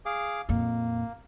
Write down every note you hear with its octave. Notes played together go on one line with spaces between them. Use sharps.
G#4 F5 D6
F2 A#2 A#3